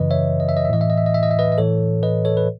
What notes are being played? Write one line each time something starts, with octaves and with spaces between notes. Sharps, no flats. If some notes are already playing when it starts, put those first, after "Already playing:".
Already playing: F#2 C#3 E3 B4 D#5
C#5 E5
D#5
E5
D#5
E5
A2 E3 D#5
E5
D#5
E5
D#5
E5
D#5
E5
B4 D#5
D#5
A2 E3 A4 C#5
B4 D#5
A4 C#5
B4